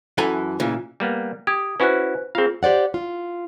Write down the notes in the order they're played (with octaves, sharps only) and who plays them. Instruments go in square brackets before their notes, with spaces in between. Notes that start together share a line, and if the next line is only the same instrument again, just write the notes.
[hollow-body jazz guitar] F#2 E3 A4 B4 G#5 A#5
A#2 C#3 E3
[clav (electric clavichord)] G3 A#3 B3
[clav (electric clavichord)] G4 [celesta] D#6 G#6
[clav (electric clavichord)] C#4 E4 F#4 [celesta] B4 C5 F#6
[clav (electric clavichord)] C4 F5 [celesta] F4 G#4
[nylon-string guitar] G4 C5 D5 F#5
F4